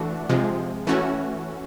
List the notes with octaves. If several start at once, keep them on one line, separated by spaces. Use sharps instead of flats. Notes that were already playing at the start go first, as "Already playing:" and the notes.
Already playing: E3 A3 D4 F#4
C3 F3 G#3
E3 A3 C#4 F#4